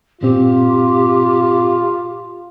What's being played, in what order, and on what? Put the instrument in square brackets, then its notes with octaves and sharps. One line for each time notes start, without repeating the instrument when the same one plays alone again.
[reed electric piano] G2 A#2 C4 [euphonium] F4 [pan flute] G4